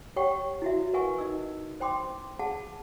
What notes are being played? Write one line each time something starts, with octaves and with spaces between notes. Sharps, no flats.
G4 C#5 F#5 G5 C#6
E4 F#4 E5
A#4 B4 E5 F#5 G#5 C#6
D#4 D#5 E6
C5 G5 C6 D6
G#4 F#5 A5